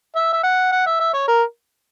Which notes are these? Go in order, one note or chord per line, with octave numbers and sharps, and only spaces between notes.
E5
E5
F#5
F#5
E5
E5
C#5
A#4